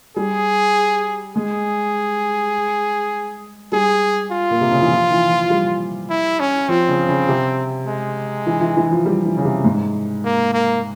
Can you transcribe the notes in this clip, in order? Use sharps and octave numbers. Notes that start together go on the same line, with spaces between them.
G3 G#4
G#3 G#4
G3 G#4
F4
A#2
C3
C#3
E3
F3
E3
F3
G3
E4
C#4
F3 C4
C#3
C#3
C3
G#3
E3
E3
E3
F3
G3
E3
C#3
C3
G#2
A#3
A#3